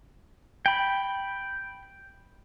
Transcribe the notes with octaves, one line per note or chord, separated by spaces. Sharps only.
G5 B5